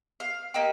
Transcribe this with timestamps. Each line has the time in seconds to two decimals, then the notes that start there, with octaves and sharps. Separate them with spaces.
0.20 F5
0.54 A#3 D#4 G4